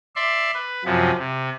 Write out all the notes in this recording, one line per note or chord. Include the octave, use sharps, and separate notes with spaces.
D5 E5 C6
B4
F#2 C3 F3 F#3
C3